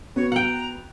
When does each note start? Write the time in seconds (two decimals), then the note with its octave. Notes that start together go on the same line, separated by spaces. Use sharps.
0.16 B3 F#4 C#5
0.32 F#5 G5 A#5